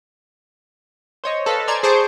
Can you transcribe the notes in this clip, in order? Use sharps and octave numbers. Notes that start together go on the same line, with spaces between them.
C5 C#5 D#5
A4 B4 D#5 F5
C5 D5 G#5 A#5 G#6 A6
G#4 C5 A5 C#6 D6 G6